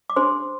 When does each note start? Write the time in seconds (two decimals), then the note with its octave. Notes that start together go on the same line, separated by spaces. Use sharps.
0.10 D6
0.16 D4 G#4 C5 C6